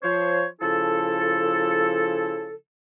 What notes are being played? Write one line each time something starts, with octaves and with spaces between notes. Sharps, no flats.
F3 C5 C#5
C#3 F3 E4 A4